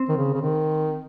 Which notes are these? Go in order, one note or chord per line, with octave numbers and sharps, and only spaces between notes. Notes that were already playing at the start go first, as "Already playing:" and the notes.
Already playing: C4
D#3
C#3
C#3
D#3